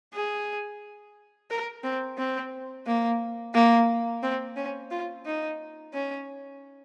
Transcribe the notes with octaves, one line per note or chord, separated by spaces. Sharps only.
G#4
A#4
C4
C4
A#3
A#3
C4
C#4
F4
D#4
C#4